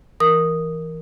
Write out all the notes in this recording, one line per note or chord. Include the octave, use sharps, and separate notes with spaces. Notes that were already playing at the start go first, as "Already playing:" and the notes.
E3 A#4 D#6